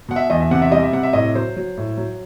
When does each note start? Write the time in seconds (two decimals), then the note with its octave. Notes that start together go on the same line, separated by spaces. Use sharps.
0.09 B2 F#5
0.16 E5
0.30 E2 D#5
0.40 E5
0.51 C3 F#5
0.62 E5
0.71 G3 D#5
0.83 E5
0.92 C3 F#5
1.03 E5
1.13 A2 D#5
1.35 F#3 C5
1.56 F#3
1.77 A2
1.97 F#3